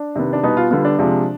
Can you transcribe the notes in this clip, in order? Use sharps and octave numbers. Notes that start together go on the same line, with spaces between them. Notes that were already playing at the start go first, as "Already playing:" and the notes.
Already playing: D4
C3 D#3 B3
D4
B2 G3 B3 D#4
F4
D3 G3 B3 F4
D4
C3 F3 G#3